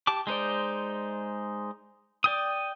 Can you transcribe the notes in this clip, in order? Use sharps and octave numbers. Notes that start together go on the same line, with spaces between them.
G4 A5 D6
G#3 D#4 C5 D5
D5 G5 D#6